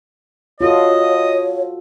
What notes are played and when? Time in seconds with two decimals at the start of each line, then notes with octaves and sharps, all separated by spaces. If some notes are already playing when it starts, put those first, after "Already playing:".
0.61 F4 F#4 A4 C#5 D#5